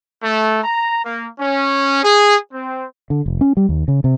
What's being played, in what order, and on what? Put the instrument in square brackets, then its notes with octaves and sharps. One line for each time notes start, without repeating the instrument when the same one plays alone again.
[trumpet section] A3
A#5
A#3
C#4
G#4
C4
[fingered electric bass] D3
F1
C#4
G3
D#2
C#3
C3